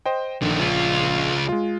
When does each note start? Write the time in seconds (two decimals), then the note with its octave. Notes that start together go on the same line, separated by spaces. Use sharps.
0.06 C5 D#5 G5
0.42 A#1 D3 D#3
0.59 C#2 F4
1.49 G#3 F4